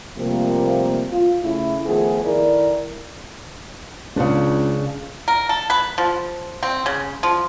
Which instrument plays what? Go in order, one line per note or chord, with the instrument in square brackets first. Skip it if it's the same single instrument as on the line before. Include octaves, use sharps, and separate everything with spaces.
[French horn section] C3 F3 G3 A3 A#3
F4
C#3 A3 C#4 E4
D#3 F3 A3 B3 F4 G#4
D#3 E4 A4 A#4 D5
[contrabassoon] C#2 [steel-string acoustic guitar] C#3 D4
[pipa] A#4
A4
B4
F3
C4
C#3
F3